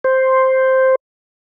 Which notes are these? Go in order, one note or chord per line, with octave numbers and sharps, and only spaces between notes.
C5